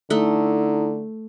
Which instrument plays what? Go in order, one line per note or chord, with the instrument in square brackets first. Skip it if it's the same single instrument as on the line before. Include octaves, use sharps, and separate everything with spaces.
[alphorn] D3 [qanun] A3 [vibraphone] D#4 E4 A#5